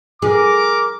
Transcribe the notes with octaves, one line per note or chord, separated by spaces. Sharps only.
G#4 A#4 D6